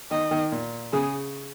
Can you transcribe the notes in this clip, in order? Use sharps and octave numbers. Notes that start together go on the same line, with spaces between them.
D#3 D#5
D#3
A#2
C#3 G#4